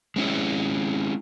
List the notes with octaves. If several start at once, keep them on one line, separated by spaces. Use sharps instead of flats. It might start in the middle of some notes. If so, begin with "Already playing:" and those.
G#3 C#4 E4